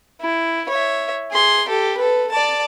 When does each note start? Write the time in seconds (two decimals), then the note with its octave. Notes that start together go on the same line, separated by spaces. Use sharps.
0.21 E4
0.69 C#5 E5
1.31 G#4 C6
1.68 G4 A4
1.98 A4 B4
2.31 D5 A5